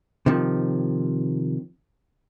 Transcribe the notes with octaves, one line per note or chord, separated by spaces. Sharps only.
C3 D#3 F3